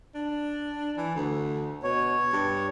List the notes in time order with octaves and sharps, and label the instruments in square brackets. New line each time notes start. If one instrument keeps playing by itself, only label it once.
[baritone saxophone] D4
E3
D2
[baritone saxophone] B2 [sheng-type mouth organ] C#5
[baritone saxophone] G2